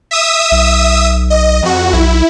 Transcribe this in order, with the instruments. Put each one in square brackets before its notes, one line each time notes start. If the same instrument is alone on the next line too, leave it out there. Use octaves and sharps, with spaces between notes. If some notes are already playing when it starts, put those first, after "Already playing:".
[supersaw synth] E5 D#6 E6
[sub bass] B1
[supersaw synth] D#5
F2 F#4
[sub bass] B1 [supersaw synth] E4